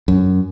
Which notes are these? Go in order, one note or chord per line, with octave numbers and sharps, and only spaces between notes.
F#2